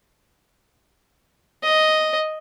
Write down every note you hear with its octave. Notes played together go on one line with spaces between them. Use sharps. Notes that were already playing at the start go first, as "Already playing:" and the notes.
D#5